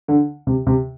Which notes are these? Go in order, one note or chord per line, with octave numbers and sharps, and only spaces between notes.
D3
C3
C3